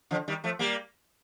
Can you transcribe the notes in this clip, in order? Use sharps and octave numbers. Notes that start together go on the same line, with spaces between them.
D3 F3
D#3 G3
F3 A3
G3 A#3